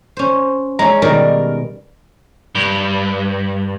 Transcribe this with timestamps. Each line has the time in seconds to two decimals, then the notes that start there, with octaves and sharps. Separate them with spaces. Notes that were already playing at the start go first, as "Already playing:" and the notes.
0.17 C#4 C5
0.79 G#3 C#4 A#5
1.02 B2 D#3 G3 A#4
2.55 G2